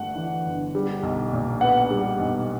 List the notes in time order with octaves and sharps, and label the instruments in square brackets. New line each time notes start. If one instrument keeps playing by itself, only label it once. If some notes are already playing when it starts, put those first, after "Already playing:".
Already playing: [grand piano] G1 G2 A3 F#5
E3
G1
G3
B1
A#2
B3 F#5
G3
B1